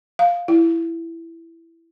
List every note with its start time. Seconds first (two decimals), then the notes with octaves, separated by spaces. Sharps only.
0.19 F5
0.48 E4